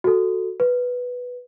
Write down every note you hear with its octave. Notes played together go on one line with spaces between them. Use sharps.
F#4 A4
B4